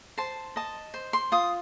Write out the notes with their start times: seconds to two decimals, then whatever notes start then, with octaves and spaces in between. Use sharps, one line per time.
0.18 C5 A5
0.56 D#5 A5
0.94 C5
1.13 C6
1.32 F4 D#6